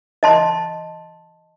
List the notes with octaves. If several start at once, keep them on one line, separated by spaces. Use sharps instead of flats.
D#5 A5 C6